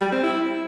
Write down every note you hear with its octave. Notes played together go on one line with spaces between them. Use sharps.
G3
C4
E4